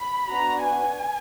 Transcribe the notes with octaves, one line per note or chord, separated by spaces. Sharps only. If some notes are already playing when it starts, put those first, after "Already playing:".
Already playing: B5
B3 D4 F#4 A#5
G#5